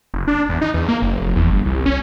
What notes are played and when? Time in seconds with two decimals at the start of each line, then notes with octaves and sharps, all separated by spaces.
0.14 F#1
0.28 D4
0.49 E2
0.61 D#4
0.74 E2
0.89 A#3
1.02 F#1
1.21 F1
1.36 E2
1.50 G1
1.66 C2
1.86 C#4